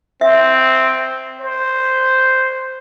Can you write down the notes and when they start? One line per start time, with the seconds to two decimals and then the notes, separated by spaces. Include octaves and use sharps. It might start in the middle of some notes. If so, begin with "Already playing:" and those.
0.21 C4 E5
1.41 C5